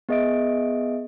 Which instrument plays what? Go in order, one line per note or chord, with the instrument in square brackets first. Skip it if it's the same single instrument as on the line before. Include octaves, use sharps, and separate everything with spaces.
[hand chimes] B3 G#4 D#5 E5 D7